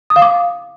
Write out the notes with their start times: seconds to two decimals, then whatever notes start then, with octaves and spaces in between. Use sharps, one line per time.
0.10 D#6
0.16 F5
0.22 D6